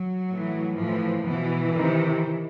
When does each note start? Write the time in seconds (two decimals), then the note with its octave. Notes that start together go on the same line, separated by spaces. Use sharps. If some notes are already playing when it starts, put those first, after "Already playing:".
Already playing: F#3
0.28 A2 E3
0.77 A2 E3 F3
1.25 B2 E3
1.73 C3 D#3